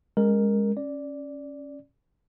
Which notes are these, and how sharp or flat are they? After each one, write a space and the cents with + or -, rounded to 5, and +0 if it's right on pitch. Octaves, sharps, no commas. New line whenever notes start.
G#3 -15 C#4 +0 A#4 +0
C#4 -10 D5 -5